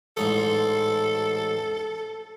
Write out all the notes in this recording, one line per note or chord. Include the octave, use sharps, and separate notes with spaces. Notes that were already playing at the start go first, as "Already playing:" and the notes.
A1 G#2 A4 D#6